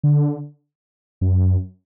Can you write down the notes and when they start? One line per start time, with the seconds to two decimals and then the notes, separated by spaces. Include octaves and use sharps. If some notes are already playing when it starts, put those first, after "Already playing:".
0.04 D3
1.21 F#2